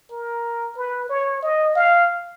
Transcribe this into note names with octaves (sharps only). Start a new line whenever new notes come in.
A#4
B4
C#5
D#5
F5